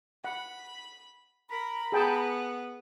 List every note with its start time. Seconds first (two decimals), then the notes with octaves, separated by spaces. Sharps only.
0.25 F#5 B5
1.50 A#4 A#5 B5
1.92 B3 G#4 G5 A5